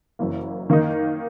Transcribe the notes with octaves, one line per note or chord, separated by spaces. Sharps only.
F#1 F#2 E3 A#3
D#3 A#3 D#4